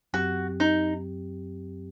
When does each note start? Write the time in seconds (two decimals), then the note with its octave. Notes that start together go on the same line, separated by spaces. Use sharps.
0.13 F#2 F#3 C4 F#4 G4
0.60 D#4